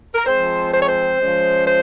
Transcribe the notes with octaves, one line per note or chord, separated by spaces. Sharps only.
A#4
F3 G#3 C4 C5
C5
C#5
C5
F3 G#3 C#4
C5